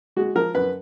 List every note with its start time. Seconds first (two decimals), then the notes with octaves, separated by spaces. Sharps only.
0.16 G#3 F#4
0.35 F3 A#4
0.55 F#2 B4